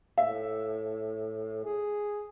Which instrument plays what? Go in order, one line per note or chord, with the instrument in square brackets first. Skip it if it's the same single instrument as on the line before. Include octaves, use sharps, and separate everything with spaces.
[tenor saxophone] A2 [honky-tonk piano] E5
[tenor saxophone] G#4